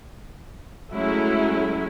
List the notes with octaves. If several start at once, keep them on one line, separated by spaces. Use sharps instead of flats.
F#3 G#3 A3 C#4 E4